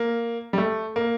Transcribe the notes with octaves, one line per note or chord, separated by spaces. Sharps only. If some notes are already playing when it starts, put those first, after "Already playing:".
Already playing: A#3
G3
A3
A#3